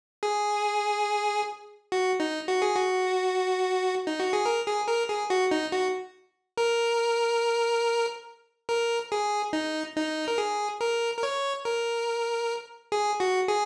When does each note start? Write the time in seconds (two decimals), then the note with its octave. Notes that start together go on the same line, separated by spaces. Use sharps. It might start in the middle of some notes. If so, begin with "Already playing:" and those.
0.23 G#4
1.92 F#4
2.20 D#4
2.48 F#4
2.62 G#4
2.75 F#4
4.07 D#4
4.20 F#4
4.33 G#4
4.46 A#4
4.67 G#4
4.88 A#4
5.09 G#4
5.30 F#4
5.51 D#4
5.72 F#4
6.58 A#4
8.69 A#4
9.12 G#4
9.53 D#4
9.96 D#4
10.28 A#4
10.38 G#4
10.81 A#4
11.18 A#4
11.23 C#5
11.65 A#4
12.92 G#4
13.20 F#4
13.48 G#4